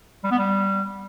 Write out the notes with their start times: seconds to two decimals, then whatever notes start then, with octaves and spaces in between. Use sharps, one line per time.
0.24 G3
0.31 B3
0.38 G3